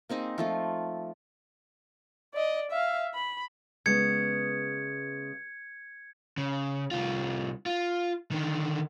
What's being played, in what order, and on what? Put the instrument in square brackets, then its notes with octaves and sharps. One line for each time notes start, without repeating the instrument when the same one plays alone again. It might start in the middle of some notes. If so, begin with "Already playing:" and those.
[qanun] A#3 C4 D#4 G#4
F3 A3 F4
[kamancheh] D5 D#5
E5 F5
B5
[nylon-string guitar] C#3 G#3 B3 [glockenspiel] G#6 C#7
[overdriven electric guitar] C#3
C2 F4
F4
D3 D#3